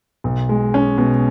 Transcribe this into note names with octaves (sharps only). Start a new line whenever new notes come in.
B1
G#3
C#4
B2